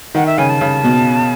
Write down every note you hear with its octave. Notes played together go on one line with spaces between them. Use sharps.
D#3 F#5
E5
C#3 G#5
A5
C#3
B2